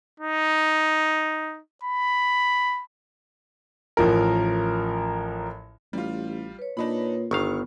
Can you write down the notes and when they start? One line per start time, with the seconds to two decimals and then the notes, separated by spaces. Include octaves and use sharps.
0.20 D#4
1.83 B5
3.97 A1 F3 A#4
5.93 A1 G3 F4
6.59 B4 C#5
6.77 A#2 D4 D#4 B5
7.31 G1 D#3 B3 F5 C#6 F6